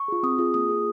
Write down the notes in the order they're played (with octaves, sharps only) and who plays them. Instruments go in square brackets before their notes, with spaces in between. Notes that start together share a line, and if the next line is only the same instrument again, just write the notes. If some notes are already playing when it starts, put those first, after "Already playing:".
Already playing: [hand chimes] C#6
F4 G#4
C4 D#6
F4 G#4
A#3 D#6
F4 G#4